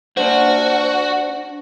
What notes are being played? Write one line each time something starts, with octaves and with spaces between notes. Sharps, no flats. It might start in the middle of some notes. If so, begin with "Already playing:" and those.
D4 F#4 C5